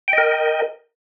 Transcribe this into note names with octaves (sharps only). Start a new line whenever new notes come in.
A#4 D#5 G5